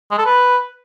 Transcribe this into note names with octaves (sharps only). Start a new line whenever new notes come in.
G#3
A4
B4